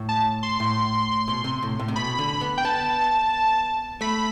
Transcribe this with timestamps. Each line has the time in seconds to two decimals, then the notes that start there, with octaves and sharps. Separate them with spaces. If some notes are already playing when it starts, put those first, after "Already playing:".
Already playing: A2
0.09 A5
0.43 C6
0.60 A2
1.28 B2
1.44 C3
1.62 A2
1.79 A2
1.88 C3
1.96 B2 B5
2.19 D3
2.41 B3
2.58 G5
2.65 B3 A5
4.01 A3 B5